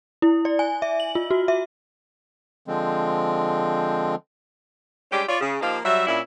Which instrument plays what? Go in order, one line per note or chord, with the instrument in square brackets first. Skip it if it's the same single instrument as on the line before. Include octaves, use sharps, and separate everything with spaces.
[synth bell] E4
D5
G#5
E5
F#7
F4
F#4
E5
[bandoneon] D3 F3 G#3 C4
[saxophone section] G3 G#3 C#4 D4 G4
F4 C#5 D5
C#3
F3 A#3 D#4 G4 C5 F5
F#3 G3 C#5 E5
A#2 C#4 D4 E4